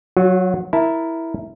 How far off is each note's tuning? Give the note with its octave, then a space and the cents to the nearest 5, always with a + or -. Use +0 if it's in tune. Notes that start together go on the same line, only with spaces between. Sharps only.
F#3 +0 F#4 -45
E4 -5 A#4 +0 A5 +0